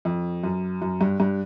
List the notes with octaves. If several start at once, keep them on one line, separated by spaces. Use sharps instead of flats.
F2
F#2
F#2
G2
G2